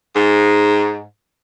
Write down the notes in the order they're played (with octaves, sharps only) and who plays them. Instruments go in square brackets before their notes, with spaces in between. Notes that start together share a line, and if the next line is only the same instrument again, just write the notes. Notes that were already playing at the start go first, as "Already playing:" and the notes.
[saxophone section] G#2